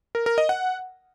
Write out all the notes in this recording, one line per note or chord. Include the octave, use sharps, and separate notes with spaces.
A#4
A#4
D#5
F#5